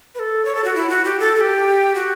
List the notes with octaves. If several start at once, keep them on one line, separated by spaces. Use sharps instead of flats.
B4
A4
C#5
A4
F#4
E4
F#4
G4
A4
A4
G4
F#4